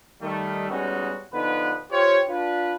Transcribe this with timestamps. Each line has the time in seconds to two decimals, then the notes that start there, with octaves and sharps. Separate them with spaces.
0.22 D#3 G3 A3
0.70 G3 G#3 B3 C#4 D#4 F#4
1.33 D3 F3 B3 D#4 B4
1.91 F4 G4 C5 C#5
2.29 D4 F4 B4